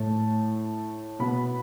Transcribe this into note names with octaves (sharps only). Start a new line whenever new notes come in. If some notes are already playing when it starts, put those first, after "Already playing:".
Already playing: A2 A3 A5
B2 B3 B5